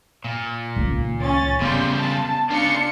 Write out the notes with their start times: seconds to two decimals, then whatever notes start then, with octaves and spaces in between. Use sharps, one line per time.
0.25 A#2
0.76 C#2 D#3
1.21 C#4 A6
1.61 C#3 G3 B3 C6 G6
1.97 A5
2.50 C#3 D4 F4 C#7